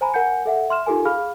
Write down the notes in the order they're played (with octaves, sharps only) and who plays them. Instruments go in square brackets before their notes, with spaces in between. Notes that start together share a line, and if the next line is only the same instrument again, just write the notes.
[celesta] C5 G#5 A#5 B5
A#4 F#5 G#5 G6 C#7
A4 E5 F#5
E5 C6 F6 E7
D#4 F4 G4 A4 A#4 G#5
G#4 F5 B5 F6